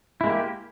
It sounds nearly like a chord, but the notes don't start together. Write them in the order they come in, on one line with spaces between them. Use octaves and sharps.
E4 G#3 A#3 G4